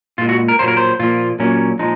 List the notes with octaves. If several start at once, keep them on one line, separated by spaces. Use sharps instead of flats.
A#2 G#3 F4
F#4
A#4
A#2 F#3 A#3 C5
A#4
C5
A#2 F3 A#3 F4
A#2 F#3 A#3 C#4
A#2 F3 G#3 D#4